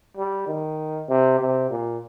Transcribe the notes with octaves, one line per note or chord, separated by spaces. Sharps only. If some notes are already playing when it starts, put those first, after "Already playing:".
G3
D#3
C3
C3
A#2